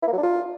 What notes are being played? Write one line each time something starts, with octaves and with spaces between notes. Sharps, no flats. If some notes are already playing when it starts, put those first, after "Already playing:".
E4
A#3
F#3
D4
F4